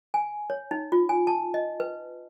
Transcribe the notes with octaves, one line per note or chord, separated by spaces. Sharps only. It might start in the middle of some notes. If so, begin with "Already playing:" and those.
G#5
C#5
D#4
F4
G#5
A5
D#5
B4